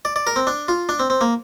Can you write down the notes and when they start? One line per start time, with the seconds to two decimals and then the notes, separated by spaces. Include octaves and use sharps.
0.05 D5
0.16 D5
0.27 A#4
0.36 C4
0.47 D4
0.68 F4
0.89 D4
0.99 C4
1.10 C4
1.21 A#3